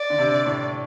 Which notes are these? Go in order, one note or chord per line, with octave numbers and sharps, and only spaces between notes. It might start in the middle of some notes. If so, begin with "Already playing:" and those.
Already playing: D5
D3
C3
A2